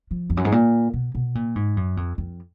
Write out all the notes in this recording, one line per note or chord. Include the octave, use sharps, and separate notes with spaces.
F3
F2
F#2
G#2
A#2
B2
B2
A#2
G#2
F#2
F2
F2